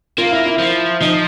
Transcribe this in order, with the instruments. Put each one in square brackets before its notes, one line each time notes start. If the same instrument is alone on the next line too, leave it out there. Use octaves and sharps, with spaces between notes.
[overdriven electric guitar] A#3 [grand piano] F4
[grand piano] E4
E4
[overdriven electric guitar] F3
[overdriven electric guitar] F3 [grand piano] D#4